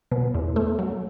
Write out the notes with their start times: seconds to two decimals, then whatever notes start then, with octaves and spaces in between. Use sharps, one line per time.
0.11 B2
0.34 E2
0.56 A3
0.79 F#3